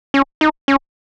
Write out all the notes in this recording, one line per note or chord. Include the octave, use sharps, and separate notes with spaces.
C#4
D#4
C#4